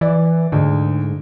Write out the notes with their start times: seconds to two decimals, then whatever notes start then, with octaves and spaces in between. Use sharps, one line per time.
0.01 E3 D5
0.52 D2 G#2